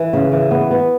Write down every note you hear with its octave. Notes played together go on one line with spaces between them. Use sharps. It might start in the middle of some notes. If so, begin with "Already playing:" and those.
Already playing: E3
C#3
E3
B3
B3